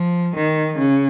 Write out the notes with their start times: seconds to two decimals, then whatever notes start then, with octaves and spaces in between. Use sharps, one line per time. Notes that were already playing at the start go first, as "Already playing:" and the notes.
Already playing: F3
0.36 D#3
0.78 C#3